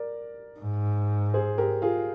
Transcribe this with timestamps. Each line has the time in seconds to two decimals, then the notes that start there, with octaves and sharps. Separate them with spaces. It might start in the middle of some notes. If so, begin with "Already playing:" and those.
Already playing: A#4 D5
0.60 G#2
1.34 G#4 C5
1.58 G4 A#4
1.82 F4 G#4